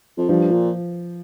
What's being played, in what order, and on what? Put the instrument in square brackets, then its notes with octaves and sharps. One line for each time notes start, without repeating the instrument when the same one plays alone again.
[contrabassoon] F2
[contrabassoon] G2 [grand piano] F3
[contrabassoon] A#2